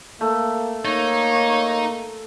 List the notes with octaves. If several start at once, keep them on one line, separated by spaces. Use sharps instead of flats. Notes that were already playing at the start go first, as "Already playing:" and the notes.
A3 A#3
A#3 D#4 C#5